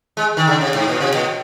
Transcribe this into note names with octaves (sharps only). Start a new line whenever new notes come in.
G#3
D#3
C#3
C3
G#2
A#2
C3
A#2